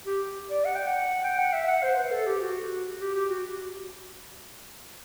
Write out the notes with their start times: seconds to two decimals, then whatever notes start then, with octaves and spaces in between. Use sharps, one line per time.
0.06 G4
0.50 D5
0.65 F#5
0.76 G5
0.87 F#5
1.24 G5
1.39 F#5
1.53 E5
1.68 F#5
1.83 C5
1.97 B4
2.11 A4
2.26 G4
2.41 F#4
3.00 G4
3.14 G4
3.29 F#4